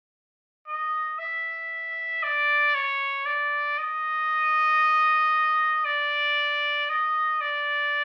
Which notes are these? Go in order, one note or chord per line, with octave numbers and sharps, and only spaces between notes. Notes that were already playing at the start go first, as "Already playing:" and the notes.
D#5
E5
D5
C#5
D5
D#5
D5
D#5
D5